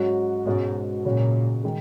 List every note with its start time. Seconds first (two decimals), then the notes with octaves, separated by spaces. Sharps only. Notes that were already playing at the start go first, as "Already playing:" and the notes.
Already playing: G#2 F#3 C#4 F#4
0.46 G#2 B2 G#3 C#4 F#4
1.05 A#2 C#3 F#3 C#4 F#4
1.64 D#3 G#3